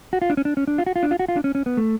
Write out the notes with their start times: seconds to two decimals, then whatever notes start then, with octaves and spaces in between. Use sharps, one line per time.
0.13 F#4
0.22 F4
0.30 D4
0.37 C#4
0.45 D4
0.57 C#4
0.68 D4
0.78 F4
0.86 F#4
0.96 F4
1.03 D4
1.11 F4
1.19 F#4
1.29 F4
1.36 D4
1.44 C#4
1.55 C#4
1.66 B3
1.77 A3